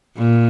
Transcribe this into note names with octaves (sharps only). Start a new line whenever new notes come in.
A#2